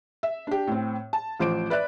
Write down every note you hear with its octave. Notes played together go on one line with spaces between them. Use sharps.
E5
D4 G4
A2 C4
A5
A1 F3 C5 D6 D7
B4 D5 E5 F#6